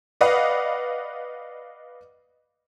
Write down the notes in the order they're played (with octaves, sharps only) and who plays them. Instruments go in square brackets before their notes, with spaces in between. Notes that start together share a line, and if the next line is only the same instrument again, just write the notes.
[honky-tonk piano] B4 D5 D#5 F5 F#5